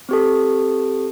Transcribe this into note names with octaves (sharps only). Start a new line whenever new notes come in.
C4 G4 A4